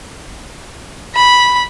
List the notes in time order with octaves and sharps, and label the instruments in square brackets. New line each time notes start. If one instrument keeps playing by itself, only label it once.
[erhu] B5